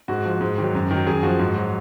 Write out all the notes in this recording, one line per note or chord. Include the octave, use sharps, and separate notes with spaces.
G#2 F#4
F3
G#2
D#3 F#3
F#2
D#3
F#3
F#2 G#4
F3 F#4
G#2
F#3